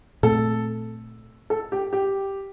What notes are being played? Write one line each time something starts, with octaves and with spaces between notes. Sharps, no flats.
A#2 A3 C4 A4
A4
G4
G4